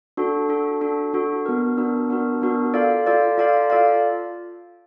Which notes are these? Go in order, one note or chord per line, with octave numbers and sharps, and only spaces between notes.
D4 F#4 A4
D4 F#4 A4
D4 F#4 A4
D4 F#4 A4
B3 D4 F#4 A#4
B3 D4 F#4 A#4
B3 D4 F#4 A#4
B3 D4 F#4 A#4
F4 A4 D5 F5
F4 A4 D5 F5
F4 A4 D5 F5
F4 A4 D5 F5